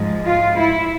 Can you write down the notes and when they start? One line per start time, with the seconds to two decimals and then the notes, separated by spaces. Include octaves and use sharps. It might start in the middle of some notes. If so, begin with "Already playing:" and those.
Already playing: G#2 F3 G#3
0.26 F4
0.58 E4